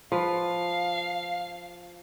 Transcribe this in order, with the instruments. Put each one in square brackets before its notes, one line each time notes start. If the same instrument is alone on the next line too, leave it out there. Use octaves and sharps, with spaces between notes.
[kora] F3 B4 [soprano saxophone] F5